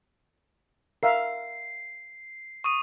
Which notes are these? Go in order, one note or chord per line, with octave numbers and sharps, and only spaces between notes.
A#4 E5 F5 C7
C#6 D#6 D#7